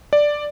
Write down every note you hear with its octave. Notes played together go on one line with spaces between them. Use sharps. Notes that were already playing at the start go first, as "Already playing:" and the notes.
D5